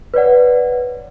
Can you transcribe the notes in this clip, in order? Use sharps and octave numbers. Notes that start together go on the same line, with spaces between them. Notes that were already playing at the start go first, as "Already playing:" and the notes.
B4 C#5 D5 F#5